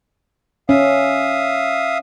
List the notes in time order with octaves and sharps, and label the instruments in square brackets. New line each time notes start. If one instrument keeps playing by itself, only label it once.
[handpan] C#4 [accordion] E5 F5 D#6